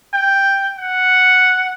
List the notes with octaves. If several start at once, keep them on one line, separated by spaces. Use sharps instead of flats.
G5
F#5